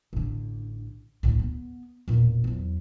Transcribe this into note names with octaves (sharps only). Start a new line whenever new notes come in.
A1 D3
D2 A2
B3
E1 A#2
E2 F#3